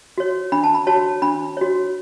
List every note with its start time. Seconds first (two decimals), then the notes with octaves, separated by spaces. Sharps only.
0.18 F#4 C#5
0.52 D4 B5
0.64 A5
0.75 B5
0.87 F#4 C#5 A5
1.22 D4 B5
1.57 F#4 C#5